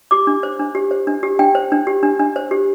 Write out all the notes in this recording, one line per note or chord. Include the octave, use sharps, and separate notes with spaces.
G4 D6
D4
C5
D4
G4
C5
D4
G4
D4 G5
C5
D4
G4
D4
D4
C5
G4